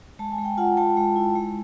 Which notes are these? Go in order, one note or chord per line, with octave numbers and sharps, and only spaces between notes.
G#3 A5
G#5
G#3
G5
F4 F#5 G#5
G#3 G5 A5
G#3
E4
G#3